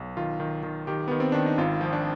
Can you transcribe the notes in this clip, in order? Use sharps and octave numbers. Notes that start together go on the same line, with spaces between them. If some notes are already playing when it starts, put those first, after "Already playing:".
Already playing: B1
D#3 F4
D#3
D#3
D#3 G4
D#3 B3
C4
D#3 D4
D#4
G#1 F4
F3
D4